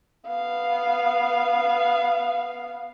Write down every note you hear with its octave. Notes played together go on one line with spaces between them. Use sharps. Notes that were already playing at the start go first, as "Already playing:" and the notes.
B3 F5